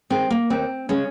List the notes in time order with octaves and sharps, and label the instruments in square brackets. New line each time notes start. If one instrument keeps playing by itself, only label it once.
[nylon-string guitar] D#3 G#3 C4
A#3
D#2 C4
C#3 G#3 C#4